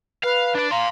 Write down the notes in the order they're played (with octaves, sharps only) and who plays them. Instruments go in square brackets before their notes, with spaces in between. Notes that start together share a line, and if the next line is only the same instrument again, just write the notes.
[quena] B4 [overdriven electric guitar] F5
[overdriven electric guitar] D4 D5
[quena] F5 [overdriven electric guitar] A#5 C6